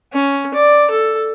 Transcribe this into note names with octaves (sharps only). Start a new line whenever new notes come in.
C#4
D5
A4